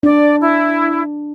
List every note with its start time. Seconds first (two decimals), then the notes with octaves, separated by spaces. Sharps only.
0.03 D4 D5
0.40 E4